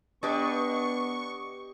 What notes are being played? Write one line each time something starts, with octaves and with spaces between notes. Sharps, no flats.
B3 D4 G4 B4 D#5 C#6